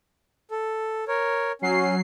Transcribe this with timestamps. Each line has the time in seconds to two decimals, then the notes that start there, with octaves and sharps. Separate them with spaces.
0.51 A4
1.08 A#4 C#5
1.62 F#3 C#4 C7